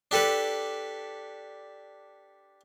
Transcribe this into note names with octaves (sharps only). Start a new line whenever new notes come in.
D4 G4 A4 B4